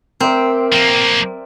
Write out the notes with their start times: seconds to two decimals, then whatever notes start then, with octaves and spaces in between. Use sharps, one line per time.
0.20 C4 A#4 D5 E5
0.73 F3 A#3